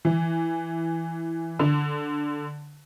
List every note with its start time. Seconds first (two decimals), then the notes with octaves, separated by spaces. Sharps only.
0.05 E3
1.59 D3